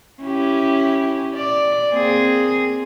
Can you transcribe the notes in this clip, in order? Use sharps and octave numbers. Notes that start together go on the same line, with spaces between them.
C#4 E4 G4
D5
A#3 C4 G#4